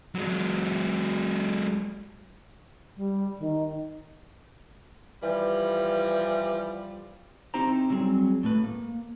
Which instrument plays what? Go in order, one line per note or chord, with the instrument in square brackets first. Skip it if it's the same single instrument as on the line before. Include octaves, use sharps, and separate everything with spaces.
[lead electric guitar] F#3 G#3
[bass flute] G3
D#3
[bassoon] E3 [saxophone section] F3 G3
[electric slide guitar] C4 D#4 E4 G4 C5 A#5
F#3 G3 C4 E4 G#4
A2 A3 B4
A#3